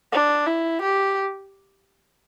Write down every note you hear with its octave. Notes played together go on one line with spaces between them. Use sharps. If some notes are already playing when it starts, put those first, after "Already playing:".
D4
E4
G4